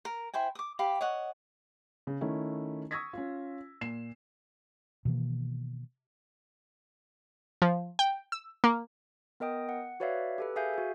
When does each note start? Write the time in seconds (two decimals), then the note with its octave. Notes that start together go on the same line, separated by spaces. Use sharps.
0.05 A#4
0.34 E4 C5 G5 G#5
0.55 D6 D#6
0.79 G4 F5 B5
1.01 C#5 D#5 F#5
2.07 C#3
2.21 D#3 A3 C#4 E4
2.91 C#6 D#6 E6 G#6 A#6 B6
3.13 C#4 F4
3.81 A#2 C7 E7
5.05 B2 D#3 E3 A#3
7.62 F3
7.99 G5
8.32 E6
8.64 A#3
9.40 B3 A#4 D#5 G5 D#6
9.69 F#5
10.00 F#4 B4 C#5 D5 E5 F5
10.38 G4 A4 B4
10.56 G#4 E5 F5 G#5 G6
10.74 F#4 G#4